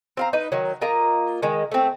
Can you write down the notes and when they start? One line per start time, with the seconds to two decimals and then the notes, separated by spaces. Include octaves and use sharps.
0.17 C4 F5 A#5
0.33 D#4 B4
0.52 D#3 F#3
0.81 A#3 F4 D#5 A#5
1.43 D#3 G#3
1.72 A3 C4